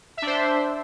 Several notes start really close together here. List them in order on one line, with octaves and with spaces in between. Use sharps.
E5 D4 C5